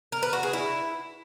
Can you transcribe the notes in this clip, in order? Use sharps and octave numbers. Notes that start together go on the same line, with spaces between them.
A#4
B4
F#4
G#4
E4